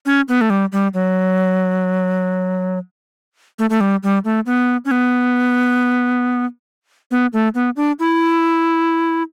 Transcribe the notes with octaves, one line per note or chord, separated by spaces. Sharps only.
C#4
B3
A3
G3
G3
F#3
A3
A3
G3
G3
A3
B3
C#4
B3
B3
A3
B3
D4
E4